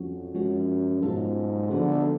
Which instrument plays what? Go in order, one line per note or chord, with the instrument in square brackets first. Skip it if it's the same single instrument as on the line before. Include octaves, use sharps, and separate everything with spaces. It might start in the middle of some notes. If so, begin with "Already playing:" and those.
Already playing: [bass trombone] F2 [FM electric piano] F#3 C#4 F#4
[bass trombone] F#2 [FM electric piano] F3 G#3 C#4 F#4
[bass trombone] G#2 [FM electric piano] B2 F#3 C#4 F4 A4
[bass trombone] D3 [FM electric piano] F3 B3 F#4